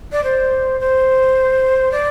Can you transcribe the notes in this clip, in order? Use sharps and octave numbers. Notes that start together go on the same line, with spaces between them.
D5
C5
C5
D5